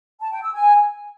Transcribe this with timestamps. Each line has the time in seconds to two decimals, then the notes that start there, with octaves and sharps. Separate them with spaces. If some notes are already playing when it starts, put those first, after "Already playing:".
0.21 A5
0.32 G5
0.43 E6
0.54 G#5